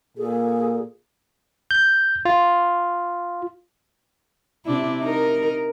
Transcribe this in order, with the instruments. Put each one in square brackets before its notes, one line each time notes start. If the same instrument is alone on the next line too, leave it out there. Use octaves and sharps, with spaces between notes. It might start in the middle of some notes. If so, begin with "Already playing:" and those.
[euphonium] A#2 [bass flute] G#4 [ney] A4
[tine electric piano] G6
F4
[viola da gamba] C3 D4 E4
D#4 A#4